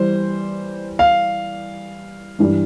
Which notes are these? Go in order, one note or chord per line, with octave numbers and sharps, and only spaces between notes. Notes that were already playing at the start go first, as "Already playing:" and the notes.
Already playing: E3 G3 C5
F5
G2 E3 G3